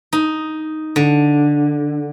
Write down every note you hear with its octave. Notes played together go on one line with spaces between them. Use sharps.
D#4
D3